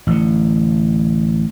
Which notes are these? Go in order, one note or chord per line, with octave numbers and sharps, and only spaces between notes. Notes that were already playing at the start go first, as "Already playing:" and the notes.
A1 D3